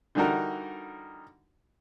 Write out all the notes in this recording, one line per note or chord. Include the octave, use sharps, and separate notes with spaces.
D3 E3 G3 D#4 F#4 A#4